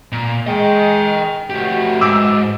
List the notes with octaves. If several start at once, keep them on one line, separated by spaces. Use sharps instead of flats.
A#2
G#3 D#5 G5
E3 F#3 A3 F#4 G4
G#2 D6 E6